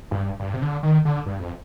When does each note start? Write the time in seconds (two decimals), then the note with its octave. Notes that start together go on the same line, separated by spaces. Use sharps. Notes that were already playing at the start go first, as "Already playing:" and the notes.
0.11 G2
0.40 G2
0.54 C3
0.62 D3
0.83 D#3
1.05 D3
1.26 G2
1.39 F2